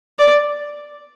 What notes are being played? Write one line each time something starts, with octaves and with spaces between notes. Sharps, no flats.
D5